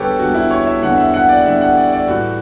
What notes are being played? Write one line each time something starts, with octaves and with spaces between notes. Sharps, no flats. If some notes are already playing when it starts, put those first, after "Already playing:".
Already playing: E2 D3 G3 G4 A4 B4 C#5
E2 D3 G3 F#4
E4
C#5
E5
E2 D3 G3 F#5
E5
F#5
D5
E2 D3 G3 E5
F#5
D5
D5
A2 E3 G3 F#4